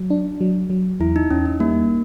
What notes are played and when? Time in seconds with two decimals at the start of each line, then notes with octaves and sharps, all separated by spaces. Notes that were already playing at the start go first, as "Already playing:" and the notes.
Already playing: F#3
0.10 D4
0.41 F#3
0.70 F#3
1.00 E2 E4
1.16 D#4
1.31 E2 C#4
1.46 D#4
1.60 G3 A#3